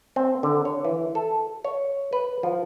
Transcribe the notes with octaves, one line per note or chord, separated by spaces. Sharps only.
C4
D3
C#5
E3
A4
C#5
B4
F3